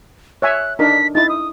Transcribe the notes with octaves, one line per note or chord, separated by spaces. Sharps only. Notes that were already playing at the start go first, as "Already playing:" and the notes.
C#5 E5 G#5 F#6
D4 D#4 A#4 B6
D#4 E4 A6
D#6